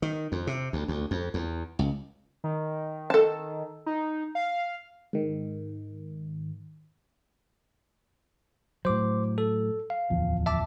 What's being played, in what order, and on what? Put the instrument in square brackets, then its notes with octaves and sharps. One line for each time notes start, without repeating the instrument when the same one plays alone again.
[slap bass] D#3
F2
C3
D2
D2
F2
E2
C#2
[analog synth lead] D#3
[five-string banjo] A4 A5
[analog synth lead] D#4
F5
[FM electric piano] G#2 D#3
[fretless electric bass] A2 F#3 [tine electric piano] C5 D6
[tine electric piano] A4
F5
[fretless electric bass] D1 E2 F3
[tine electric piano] E5 A5 D6